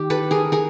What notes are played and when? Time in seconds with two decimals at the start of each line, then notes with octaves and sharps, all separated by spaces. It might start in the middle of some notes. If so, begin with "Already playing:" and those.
Already playing: D#3 G4
0.10 A4 B4
0.31 G#4 A#4
0.52 G#4 A#4